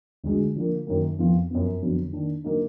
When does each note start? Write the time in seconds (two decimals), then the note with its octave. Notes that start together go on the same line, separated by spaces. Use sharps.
0.24 D2 D3 G#3 D4 F#4
0.56 D3 F3 A#3
0.87 F#2 D#3 F#3 A#3
1.19 F2 F3 B3 F4
1.50 F#2 F3 B3
1.82 F2 D3 F#3 B3
2.13 D#3 A#3 D4
2.44 D3 F#3 A#3 D#4